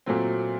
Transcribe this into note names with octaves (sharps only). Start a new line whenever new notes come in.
A#2 F#3 A3 C4